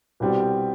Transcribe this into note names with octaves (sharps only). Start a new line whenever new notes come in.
C2 B2 G3 C4